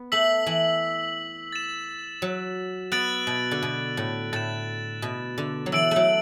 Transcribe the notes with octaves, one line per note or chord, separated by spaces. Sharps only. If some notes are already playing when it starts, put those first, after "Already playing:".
Already playing: B3
A3 E6 B6 F#7
E3
A6 E7
F#3
B3 F#6 A6 D7 F#7
B2
D3
B2
A2
A2 A6 E7
B2
D3
F#3
E3 E6 D7 F#7
F#3 A3